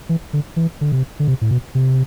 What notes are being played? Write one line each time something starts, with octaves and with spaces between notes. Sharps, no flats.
E3
D3
E3
D3
C3
D3
C3
A2
B2
C3